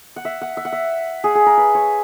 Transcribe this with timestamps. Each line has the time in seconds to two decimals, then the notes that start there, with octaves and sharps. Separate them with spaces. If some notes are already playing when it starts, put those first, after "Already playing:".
0.16 F#5
0.25 E5
0.41 F#5
0.57 E5
0.65 F#5
0.72 E5
1.24 G#4
1.35 G#4
1.46 A#4
1.58 B4
1.75 C#5